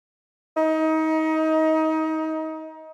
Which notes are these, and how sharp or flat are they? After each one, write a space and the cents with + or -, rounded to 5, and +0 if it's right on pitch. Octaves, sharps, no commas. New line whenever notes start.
D#4 +25